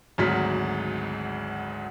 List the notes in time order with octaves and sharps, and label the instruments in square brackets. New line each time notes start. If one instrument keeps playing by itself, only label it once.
[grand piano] G#1 D2 G#2 F#3 F6 B6